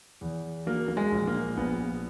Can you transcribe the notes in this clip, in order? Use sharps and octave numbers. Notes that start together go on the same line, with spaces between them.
E2
F#3 A#3
A#3
G#3
A#1
A#3
A#1 B3